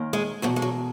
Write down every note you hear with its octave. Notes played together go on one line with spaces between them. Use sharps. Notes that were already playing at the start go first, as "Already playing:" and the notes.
Already playing: D#2 D#3
G#3
E2 B2 F#3
G#3
F#3